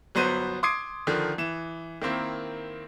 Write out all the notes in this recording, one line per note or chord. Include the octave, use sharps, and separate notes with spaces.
G1 F#3 B3 C5 D#7
C6 D6 D#6 G#6 C7 D7
D3 D#3 F3
E3 E7
D#3 A#3 C4 E4